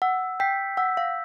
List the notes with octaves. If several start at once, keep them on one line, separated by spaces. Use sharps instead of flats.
F#5 E6
G5 G6 B6
F#5 E6
F5